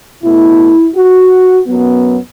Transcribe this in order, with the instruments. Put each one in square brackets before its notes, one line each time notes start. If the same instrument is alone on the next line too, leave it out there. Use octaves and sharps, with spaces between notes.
[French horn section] B2 A3 E4
F#4
F#2 F#3 B3